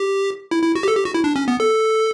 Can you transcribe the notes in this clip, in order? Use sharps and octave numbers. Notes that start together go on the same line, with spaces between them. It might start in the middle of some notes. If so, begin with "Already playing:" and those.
Already playing: G4
E4
E4
F#4
G4
A4
G4
F#4
E4
D4
C#4
B3
A4